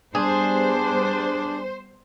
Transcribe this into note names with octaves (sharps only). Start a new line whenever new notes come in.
G3 B3 D4 G#4 C5